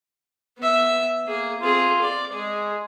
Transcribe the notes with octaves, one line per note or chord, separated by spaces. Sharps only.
B3 E5
A#3 G#4
C4 F4 G#4
D5
G#3 G#4